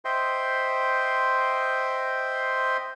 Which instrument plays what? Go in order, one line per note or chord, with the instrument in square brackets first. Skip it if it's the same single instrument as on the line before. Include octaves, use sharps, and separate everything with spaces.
[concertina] C5 D#5 E5 G5 C6